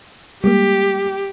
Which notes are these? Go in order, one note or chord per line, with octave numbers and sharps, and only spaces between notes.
G3 G#3 A#3 G4